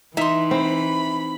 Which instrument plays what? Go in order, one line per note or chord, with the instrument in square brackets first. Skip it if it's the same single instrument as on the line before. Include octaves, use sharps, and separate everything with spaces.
[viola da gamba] E3 [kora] D#4 [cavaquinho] E5 C6
[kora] C4 [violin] B5